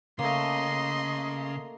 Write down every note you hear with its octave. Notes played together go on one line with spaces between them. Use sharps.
C#3 A3 A#3 D#5 C6